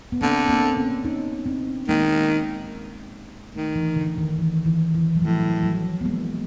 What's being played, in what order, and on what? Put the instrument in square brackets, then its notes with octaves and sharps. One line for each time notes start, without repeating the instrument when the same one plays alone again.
[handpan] B3
[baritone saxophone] D3 [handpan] A#3 C4
[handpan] A#3 C4
B3 C#4
C#4 D#4
C4 D4
[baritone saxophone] D#3 [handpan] G#3 A#3
[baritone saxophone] D#3 [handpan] A3
[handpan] E3
D3
D#3
E3
E3
E3
F#3
[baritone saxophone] A2 [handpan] F3
[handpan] F#3
F#3
B3
G#3 A#3